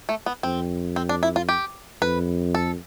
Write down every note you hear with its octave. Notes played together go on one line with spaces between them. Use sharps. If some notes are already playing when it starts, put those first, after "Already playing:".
A3
B3
F2 C4
C4
D4
E4
F4
G4
F2 B4
A4